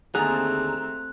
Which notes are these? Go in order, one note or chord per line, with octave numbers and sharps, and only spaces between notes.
D#2 D3 A3 C4 G#4 A#5 F#6